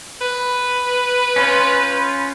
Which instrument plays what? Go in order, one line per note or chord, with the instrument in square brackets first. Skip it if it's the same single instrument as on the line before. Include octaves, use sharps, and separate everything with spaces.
[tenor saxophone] B4
[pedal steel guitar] C#4 F4 C5